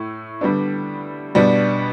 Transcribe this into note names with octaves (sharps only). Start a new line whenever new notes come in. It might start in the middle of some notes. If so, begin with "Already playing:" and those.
Already playing: A2 A3
D3 G3 B3 D4
B2 G3 B3 D4